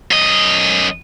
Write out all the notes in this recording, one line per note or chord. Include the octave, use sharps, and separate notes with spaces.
F#2 D#5